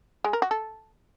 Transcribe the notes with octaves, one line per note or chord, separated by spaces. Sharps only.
G#3
A#4
F#4
A4